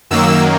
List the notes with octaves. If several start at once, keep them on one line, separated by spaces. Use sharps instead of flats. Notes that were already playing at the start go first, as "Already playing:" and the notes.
F#2 D#3 F#3 A#3 E6